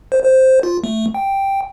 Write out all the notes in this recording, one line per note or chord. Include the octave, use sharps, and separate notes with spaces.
C5
C5
F4
A3
G5